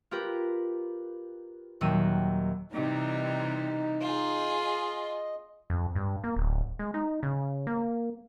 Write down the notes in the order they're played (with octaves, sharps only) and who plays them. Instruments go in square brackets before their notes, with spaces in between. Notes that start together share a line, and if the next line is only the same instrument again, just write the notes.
[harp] F4 G4 A#4 B4
D#1 D#2 F#3 E6 D#7
[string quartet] C3 E3 G3 [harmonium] D#4
[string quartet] F4 G#4
[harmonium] D#5
[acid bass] F2
G2
A#3
D1
G#3
D#4
C#3
A#3